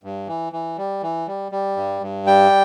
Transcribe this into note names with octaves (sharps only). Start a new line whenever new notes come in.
G2
E3
E3
G3
E3
G3
G3
G2
G2
G3 G5